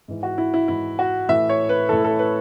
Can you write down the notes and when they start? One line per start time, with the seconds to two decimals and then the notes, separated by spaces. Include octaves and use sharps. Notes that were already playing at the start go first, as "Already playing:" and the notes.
0.08 G#2 E3
0.23 F#4
0.38 E4
0.54 E4
0.68 G#2 E3 E4
0.99 F#4
1.29 A2 E3 E5
1.49 C#5
1.69 B4
1.89 A2 E3 A4
2.05 A4
2.19 B4